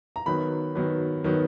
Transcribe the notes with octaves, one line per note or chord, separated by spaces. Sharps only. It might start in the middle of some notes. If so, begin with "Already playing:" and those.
A#5
D#3 F#3 B3 B5
D#3 F#3 B3
D#3 F#3 B3